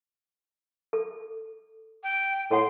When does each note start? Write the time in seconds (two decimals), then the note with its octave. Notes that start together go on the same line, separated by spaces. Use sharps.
0.93 A4
2.03 G5
2.51 A2 A4 F#5 C6